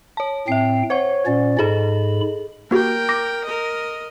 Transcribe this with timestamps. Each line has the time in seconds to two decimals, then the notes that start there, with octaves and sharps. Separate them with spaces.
0.17 C#5 A5
0.48 A2 C4 E5 G5 C7
0.90 C5 C#5 F#5 C#6
1.26 A#2 C#4 D5
1.59 G#2 G#4 A4 D#5 B5
2.71 A#3 F#4 G4 A#4 G5
3.09 D6 A#6
3.45 A#4 D#5